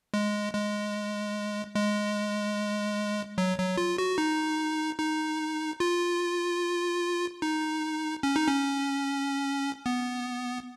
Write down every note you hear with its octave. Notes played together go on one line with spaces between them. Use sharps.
G#3
G#3
G#3
F#3
F#3
F4
F#4
D#4
D#4
F4
D#4
C#4
D#4
C#4
B3